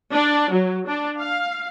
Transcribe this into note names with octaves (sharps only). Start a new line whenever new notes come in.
D4
F#3
D4
F5